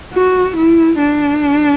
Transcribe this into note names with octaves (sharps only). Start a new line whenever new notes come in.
F#4
E4
D4